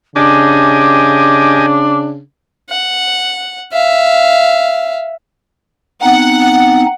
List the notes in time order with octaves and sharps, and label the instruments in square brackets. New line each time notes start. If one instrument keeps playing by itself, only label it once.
[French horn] C#3 [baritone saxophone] D4 [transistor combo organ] G4 D#5 G#5 [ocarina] D6
[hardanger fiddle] F#5
E5 F5
[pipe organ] B3 C4 D#4 [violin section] F#5